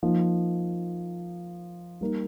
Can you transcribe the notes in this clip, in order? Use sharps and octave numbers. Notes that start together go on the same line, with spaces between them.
F3 A#3 D#4
G3 A#3 D#4 A#4